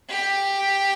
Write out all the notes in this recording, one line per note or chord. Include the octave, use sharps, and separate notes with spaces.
G4